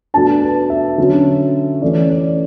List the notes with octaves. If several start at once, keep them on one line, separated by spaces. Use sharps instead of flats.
B2 A3 D4 A5
B4
E5
D3 F#3 C#4
E3 A3 C#4 D5
D5